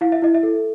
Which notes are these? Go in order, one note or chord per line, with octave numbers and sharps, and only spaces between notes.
E4 F5
E5
E4 D#5
E5
A4